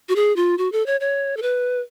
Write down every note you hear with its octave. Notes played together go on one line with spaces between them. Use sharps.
F#4
G#4
F4
F#4
A4
C#5
C#5
A4
B4